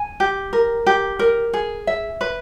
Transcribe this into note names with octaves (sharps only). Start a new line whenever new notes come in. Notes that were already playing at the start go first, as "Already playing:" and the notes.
Already playing: G#5
G4
A#4
G4
A#4
G#4
E5
B4